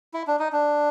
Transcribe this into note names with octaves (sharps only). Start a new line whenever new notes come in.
E4
D4
D#4
D4